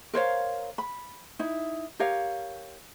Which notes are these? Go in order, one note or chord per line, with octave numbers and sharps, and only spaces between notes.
A#4 C5 C#5 F5
B5
D#4 E4
G4 A#4 C#5 F5